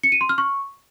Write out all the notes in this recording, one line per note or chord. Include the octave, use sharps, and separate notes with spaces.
C#7
D#7
C6
F6
C#6